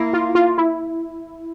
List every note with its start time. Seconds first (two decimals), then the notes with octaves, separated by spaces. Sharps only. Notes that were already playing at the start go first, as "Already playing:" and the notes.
Already playing: A#3 E4
0.13 F4
0.35 F4
0.58 E4